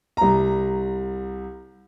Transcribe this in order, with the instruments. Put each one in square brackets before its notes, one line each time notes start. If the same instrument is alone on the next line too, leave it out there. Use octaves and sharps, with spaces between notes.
[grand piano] C2 A#5